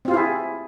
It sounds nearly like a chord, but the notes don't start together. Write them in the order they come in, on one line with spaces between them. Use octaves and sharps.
C4 F4 G4 E4 G#4